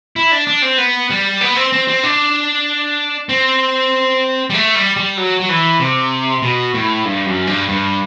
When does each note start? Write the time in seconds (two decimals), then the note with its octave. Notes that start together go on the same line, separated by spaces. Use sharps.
0.16 E4
0.32 D4
0.47 D4
0.62 C4
0.78 B3
1.10 G3
1.41 B3
1.56 C4
1.73 C4
1.88 C4
2.03 D4
3.29 C4
4.50 G3
4.54 A3
4.76 G3
4.97 G3
5.17 F#3
5.40 F#3
5.49 E3
5.80 C3
6.42 B2
6.74 A2
7.05 G2
7.26 F#2
7.47 G2
7.69 G2